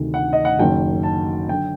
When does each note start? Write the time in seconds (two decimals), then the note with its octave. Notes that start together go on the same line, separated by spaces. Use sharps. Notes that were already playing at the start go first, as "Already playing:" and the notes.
Already playing: D2 C3 D#3
0.14 F#5
0.33 D#5
0.45 F#5
0.59 F#1 F#2 D#3 F#3 G5
1.03 A5
1.49 D3 F#3 G5